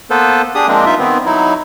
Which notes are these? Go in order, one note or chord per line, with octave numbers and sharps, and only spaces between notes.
A#3 B3 A4 B4 C5
D4 G4 G#4 D#6
F3 G#3 A#3 C4 D4
G2 D#4 F4 E5
D#3 B3 C4
F#3 D#4 E4